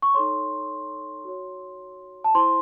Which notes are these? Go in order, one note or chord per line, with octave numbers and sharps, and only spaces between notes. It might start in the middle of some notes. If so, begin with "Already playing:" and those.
C#6
D#4 A4 C#5 C6
F#4 C#5
A5
E4 C5 C6